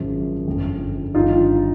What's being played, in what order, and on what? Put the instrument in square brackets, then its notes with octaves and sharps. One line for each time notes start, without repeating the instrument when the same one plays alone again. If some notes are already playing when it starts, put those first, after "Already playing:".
Already playing: [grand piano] G#1 F#2 C#3 F3 G#3
G1 F2 C#3
[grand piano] G1 G2 D#3 [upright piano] D#4 F4